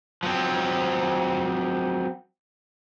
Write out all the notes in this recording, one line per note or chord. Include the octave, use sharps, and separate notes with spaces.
F3 F#3 C4